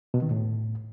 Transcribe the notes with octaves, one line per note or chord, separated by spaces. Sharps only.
B2
D#3
A2